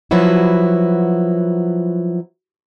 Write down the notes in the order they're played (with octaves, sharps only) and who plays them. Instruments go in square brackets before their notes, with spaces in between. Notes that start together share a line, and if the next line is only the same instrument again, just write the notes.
[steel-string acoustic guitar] F3 F#3 B3 E4 F#4